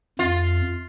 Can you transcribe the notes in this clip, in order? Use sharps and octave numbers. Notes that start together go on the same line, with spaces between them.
F2 F4